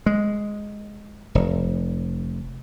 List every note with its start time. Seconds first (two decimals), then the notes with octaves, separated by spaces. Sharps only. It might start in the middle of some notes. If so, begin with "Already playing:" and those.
0.06 G#3
1.35 F1